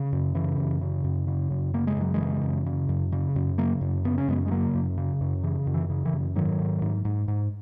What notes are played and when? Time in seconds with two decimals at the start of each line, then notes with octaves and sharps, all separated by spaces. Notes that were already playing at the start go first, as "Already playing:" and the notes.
Already playing: C#3
0.13 F#2
0.35 C#3 E3
0.58 F#2
0.81 C#3
1.04 F#2
1.27 C#3
1.51 F#2
1.74 C#3 A#3
1.87 G#3
1.96 F#2 F#3
2.14 E3 G#3
2.20 C#3
2.43 F#2
2.66 C#3
2.89 F#2
3.12 C#3
3.36 F#2
3.58 C#3 F#3 A#3
3.81 F#2
4.04 C#3 B3
4.18 C#4
4.28 F#2 G#3 B3
4.46 G#3
4.51 C#3 F#3 A#3
4.75 F#2
4.97 C#3
5.21 F#2
5.43 C#3 E3
5.67 F#2
5.74 E3
5.90 C#3
6.06 E3
6.13 F#2
6.35 G#2 D#3 F#3
6.60 G#2
6.82 G#2
7.05 G#2
7.28 G#2